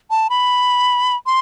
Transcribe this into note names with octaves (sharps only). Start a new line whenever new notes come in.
A5
B5
C6